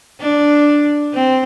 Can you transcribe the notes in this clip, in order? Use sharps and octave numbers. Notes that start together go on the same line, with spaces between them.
D4
C4